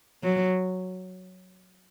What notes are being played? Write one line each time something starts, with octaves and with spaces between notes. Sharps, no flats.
F#3